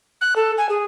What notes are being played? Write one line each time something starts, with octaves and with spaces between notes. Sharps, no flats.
F#6
A4
G#5
G#4